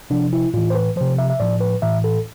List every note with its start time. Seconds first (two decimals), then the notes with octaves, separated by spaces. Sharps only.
0.10 C3 F3 D4
0.33 E4
0.54 A2 E3 F4
0.70 C5
0.75 B4
0.96 C3 F3 C5
1.18 E5
1.30 E5
1.40 A2 F3 D5
1.61 B4
1.82 A2 E3 E5
2.04 A4